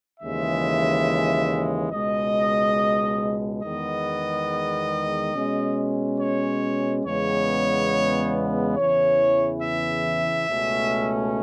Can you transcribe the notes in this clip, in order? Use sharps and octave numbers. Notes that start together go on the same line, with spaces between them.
D#2 C#3 E3 G#3 E5
C#2 B2 G#3 D#5
E2 D#3 G#3 B3 D#5
B2 G#3 C#4
C#5
E2 C#3 G#3 B3 C#5
E2 C#3 E3 C#5
E5
C#2 B2 A3 C#4